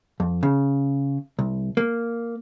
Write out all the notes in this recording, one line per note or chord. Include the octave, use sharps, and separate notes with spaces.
F2
C#3
C2
A#3